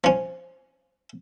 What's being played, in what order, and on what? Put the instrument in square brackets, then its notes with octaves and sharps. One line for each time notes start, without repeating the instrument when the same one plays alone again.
[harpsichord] F3 C#4